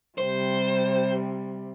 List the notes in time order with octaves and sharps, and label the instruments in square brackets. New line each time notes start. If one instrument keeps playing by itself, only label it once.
[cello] C3 G3 [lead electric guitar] C5